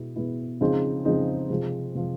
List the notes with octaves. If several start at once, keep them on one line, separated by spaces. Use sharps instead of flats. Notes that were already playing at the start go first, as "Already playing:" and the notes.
Already playing: B2 G#3 B3 E4
B2 G#3 B3 E4
C#3 F3 G#3 C4 D#4
C#3 F3 G#3 C4 D#4
C3 F3 G#3
C3 F3 G#3